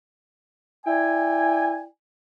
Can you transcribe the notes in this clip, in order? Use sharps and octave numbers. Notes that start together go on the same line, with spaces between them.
E4 D5 G5 G#5